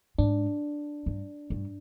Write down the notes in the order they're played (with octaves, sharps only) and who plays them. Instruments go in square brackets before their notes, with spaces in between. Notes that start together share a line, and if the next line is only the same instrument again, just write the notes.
[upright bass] G#2 [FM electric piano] D4
[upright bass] G2
G2